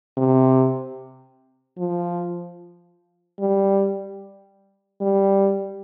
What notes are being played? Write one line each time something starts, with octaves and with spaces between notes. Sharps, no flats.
C3
F3
G3
G3